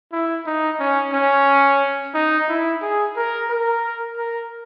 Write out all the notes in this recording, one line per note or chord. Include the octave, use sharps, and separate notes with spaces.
E4
D#4
C#4
C#4
D#4
E4
G#4
A#4
A#4
A#4